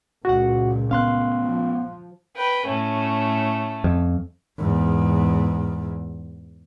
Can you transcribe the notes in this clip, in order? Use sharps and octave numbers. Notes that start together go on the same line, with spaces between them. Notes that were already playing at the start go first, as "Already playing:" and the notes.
C#2 A#2 F#4 F#5
B3 C#4 F5 C6 F#6
F3
B4 G5
A2 A3 C#4
F2
E2 G#2